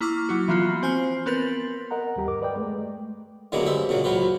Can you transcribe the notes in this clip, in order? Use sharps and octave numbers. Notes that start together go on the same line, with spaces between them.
A#3 E4 C#6 D6 F6
F#3 E4 F#4
E3 F3 A#3 B3 F4 F#4
C4 C5 G#5 F6 C7
B3 C4 A#4 B4 A6
A#4 D#5 F#5 A#5
D#2 G3 G4 A#5
G2 A#4 D6
B4 D5 D#5 G5
G#3 A3
G2 D3 F#3 G#3 A#3 B3
G2 G#3 C5 E5 C6
A#2 C#3 F#3
C#2 F#3 F4 B4 C5